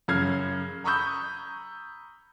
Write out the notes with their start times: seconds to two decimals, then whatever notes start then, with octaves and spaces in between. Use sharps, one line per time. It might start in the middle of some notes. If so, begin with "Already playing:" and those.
0.08 F#2 C#3 F6 G#6 C7
0.84 A#5 B5 C#6 D#6 E6 G6